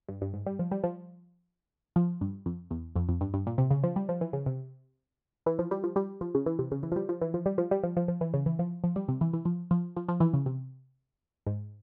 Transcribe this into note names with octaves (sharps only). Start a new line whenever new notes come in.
G2
G2
G#2
G3
F3
G3
F3
F3
G2
F2
E2
F2
F2
G2
G2
A#2
C3
C#3
F3
G3
F3
E3
C#3
C3
E3
F3
G3
F3
G3
F3
C#3
E3
C3
C#3
E3
F3
G3
F3
E3
F3
G3
F3
G3
F3
F3
F3
E3
C#3
E3
F3
F3
G3
C3
E3
E3
F3
F3
F3
F3
E3
C#3
C3
G#2